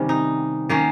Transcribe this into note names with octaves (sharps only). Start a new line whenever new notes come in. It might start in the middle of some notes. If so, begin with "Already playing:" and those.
Already playing: C3 D#3 G3 C#4
D#4
D#3 A#3 C#4